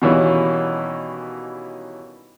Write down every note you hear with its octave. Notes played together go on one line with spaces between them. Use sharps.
B2 D#3 E3 G3 A#3 C#4